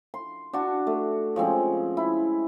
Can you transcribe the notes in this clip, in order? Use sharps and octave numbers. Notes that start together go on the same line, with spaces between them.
C6
D4 F#4 A5
A3
F3 G#3 C4 C#4
E4